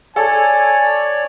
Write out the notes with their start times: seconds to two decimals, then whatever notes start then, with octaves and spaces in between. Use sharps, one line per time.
0.16 A4 C#5 D5 G#5